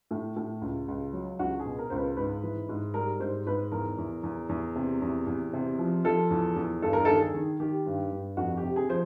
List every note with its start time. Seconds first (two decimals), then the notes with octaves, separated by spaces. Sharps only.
0.11 A2
0.36 A2
0.62 C#2
0.88 C#2
1.13 F#3
1.39 C#2 F#4
1.59 G#4
1.66 B2
1.79 A#4
1.90 C#2 C5
1.97 B4
2.17 G#2 B4
2.43 E3
2.69 G#2
2.94 G3 A#4
3.20 G#2 C5
3.46 G#2 B4
3.72 E2 A#4
3.98 E2
4.23 E2
4.49 E2
4.75 C3
5.02 E2
5.27 E2
5.53 C3
5.79 F3
6.04 F3 A4
6.31 E2
6.56 E2
6.82 G2 A4
6.93 A#4
7.05 D#3 A4
7.21 G#4
7.35 D#3
7.60 D#3 G4
7.86 G2
8.11 G2
8.37 F2 F#4
8.57 G4
8.63 C3
8.76 G#4
8.89 F3 C5